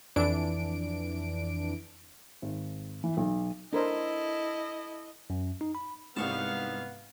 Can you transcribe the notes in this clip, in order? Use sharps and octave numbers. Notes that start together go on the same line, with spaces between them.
F2 E3 D4 D7
G#1
E3
B1
D4 E4 A4 A#4 C5 D#5
F#2
D#4
B5
C2 G#2 B3 C#5 F5 A5